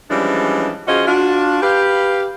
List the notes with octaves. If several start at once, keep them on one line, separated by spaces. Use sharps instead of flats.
E3 F3 G3 G#3 C#4 D4
F3 C#4 F4 F#4 G#4 D#5
D4 F4 F#4
G4 B4 F5